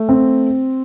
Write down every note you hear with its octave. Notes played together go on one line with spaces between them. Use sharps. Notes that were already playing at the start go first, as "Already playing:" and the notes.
Already playing: A3
C4